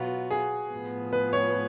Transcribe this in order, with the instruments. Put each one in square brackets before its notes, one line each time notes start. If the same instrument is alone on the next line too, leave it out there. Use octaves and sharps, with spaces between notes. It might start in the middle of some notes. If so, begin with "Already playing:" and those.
Already playing: [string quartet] B2 F#3 B3 F4 [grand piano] F#4
[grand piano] G#4
[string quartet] A2 F3 B3
[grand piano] B4
C#5